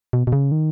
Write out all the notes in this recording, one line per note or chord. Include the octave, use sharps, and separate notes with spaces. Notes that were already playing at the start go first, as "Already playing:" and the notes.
B2
B2
C#3
D#3